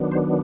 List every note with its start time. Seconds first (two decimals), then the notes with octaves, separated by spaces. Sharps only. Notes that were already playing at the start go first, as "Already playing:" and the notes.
Already playing: D#3 F#3 B3 D4
0.12 C5